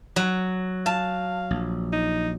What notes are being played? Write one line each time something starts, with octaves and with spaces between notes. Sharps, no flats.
F#3
F5 A5
A#1
D#4